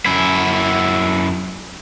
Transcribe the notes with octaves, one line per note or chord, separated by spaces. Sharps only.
F#2 E4